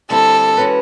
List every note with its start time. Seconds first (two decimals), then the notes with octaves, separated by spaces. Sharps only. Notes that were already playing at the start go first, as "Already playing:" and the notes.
0.10 D3 G3 C4 E4 A4
0.57 E3 G#3 C#4 F#4 B4